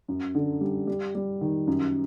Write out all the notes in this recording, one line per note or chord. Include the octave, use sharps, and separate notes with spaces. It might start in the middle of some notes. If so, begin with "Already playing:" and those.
F#2
D3
G3
G3
G3
D#3
F#2